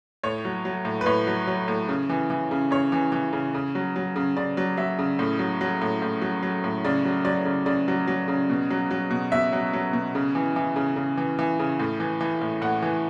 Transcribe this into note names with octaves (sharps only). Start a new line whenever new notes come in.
A2 C#5
F#3
F#3
A2
B4
A2 C#5
F#3
F#3
A2
C#3
E3
E3
C#3
C#3 C#5
E3
E3
C#3
C#3
F#3
F#3
C#3
C#3 D5
F#3
F#3 E5
C#3
A2
F#3
F#3
A2
A2
F#3
F#3
A2
C#3 D5
F#3
F#3 D5
C#3
C#3 D5
F#3
F#3
C#3
B2
F#3
F#3
B2
B2 E5
F#3
F#3
B2
C#3
E3
E3
C#3
C#3
E3
E3
C#3
A2
E3
E3
A2
A2 F#5
E3